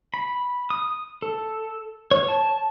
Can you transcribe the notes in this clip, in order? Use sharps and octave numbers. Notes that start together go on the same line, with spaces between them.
B5
D#6
A4
C#5
A5